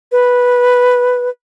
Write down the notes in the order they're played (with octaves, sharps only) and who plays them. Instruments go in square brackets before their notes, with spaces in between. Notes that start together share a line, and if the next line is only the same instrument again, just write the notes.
[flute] B4